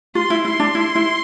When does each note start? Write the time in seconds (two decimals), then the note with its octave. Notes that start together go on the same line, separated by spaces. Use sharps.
0.15 F4 C6
0.30 E4
0.45 E4 C6
0.60 D4
0.75 E4
0.95 E4